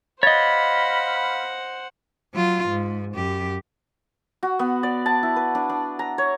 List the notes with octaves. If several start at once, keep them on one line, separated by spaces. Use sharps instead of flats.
C5 C#5 D#5 F5 F#5 B5 A6
F#3 F4
G#2
F#2 G4
F#4
B3
D5
A5
E4
B4
D4
D4
A#5
C#5